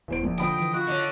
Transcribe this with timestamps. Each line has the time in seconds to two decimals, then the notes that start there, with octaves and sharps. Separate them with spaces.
0.08 D#1 E2 C5 D7
0.23 A#1
0.38 D3 F3 D#5 G5 B5
0.58 E3
0.74 F4 F#4
0.87 D3 C#5 D#5